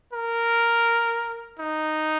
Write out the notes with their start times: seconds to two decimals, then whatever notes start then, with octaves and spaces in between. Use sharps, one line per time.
0.13 A#4
1.59 D#4